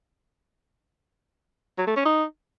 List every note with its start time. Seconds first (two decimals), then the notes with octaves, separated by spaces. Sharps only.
1.78 F#3
1.87 A3
1.96 C#4
2.05 D#4